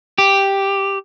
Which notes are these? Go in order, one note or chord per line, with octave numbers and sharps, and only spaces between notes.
G4